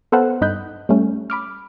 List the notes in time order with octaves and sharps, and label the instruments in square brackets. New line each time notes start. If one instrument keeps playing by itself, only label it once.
[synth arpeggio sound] B3 A4 B4 C5 F5 F#5
G2 D#4 D#5 B5 F#6 G6
G3 A3 C#4
B5 D6 F6